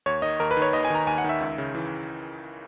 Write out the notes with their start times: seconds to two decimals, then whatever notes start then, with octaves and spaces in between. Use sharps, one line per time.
0.06 D#2 C#5
0.22 D#3 D#5
0.40 D#2 A#4
0.51 B4
0.57 D#3
0.62 C#5
0.73 D#2 D#5
0.85 G#5
0.90 D#3 A#5
1.07 D#2 G#5
1.18 F#5
1.24 D#3 E5
1.40 C#2
1.58 C#3
1.75 E3